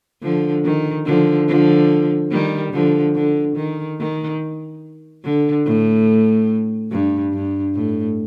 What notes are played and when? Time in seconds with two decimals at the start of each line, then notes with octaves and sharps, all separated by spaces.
0.22 D3 F3
0.64 D#3
1.06 D3 F3
1.48 D3 F3
2.31 D#3 G3
2.73 D3 F3
3.15 D3
3.56 D#3
3.99 D#3
5.24 D3
5.65 A2
6.91 G2
7.33 G2
7.75 A2